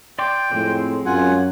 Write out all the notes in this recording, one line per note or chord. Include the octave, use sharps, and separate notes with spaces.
D5 G5 C6 D6
F2 A2 G#3 C4
F#2 F4 F#5 G#5